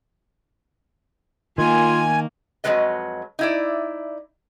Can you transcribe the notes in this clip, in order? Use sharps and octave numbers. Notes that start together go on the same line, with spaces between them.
D#3 A#3 F4 G#5
F2 G#2 F#3 G#3 B4 D#5
D#4 E4 D5